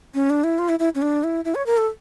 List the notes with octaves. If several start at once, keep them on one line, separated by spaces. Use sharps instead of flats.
C#4
D4
E4
F4
E4
E4
C#4
D4
E4
E4
C#5
A#4
A4